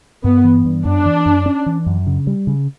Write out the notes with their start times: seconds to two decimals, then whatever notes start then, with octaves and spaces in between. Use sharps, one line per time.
0.24 G2 B3
0.44 E3
0.65 G2
0.85 F#2 D4
1.06 E3
1.26 F#2
1.46 C#4
1.66 E3
1.86 F#2
2.07 C#3
2.27 G3
2.47 C#3